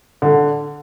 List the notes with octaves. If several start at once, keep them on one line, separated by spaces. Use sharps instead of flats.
D3